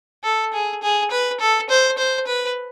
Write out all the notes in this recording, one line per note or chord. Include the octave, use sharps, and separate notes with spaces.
A4
G#4
G#4
B4
A4
C5
C5
B4